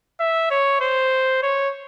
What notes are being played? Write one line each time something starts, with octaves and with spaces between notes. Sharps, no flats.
E5
C#5
C5
C#5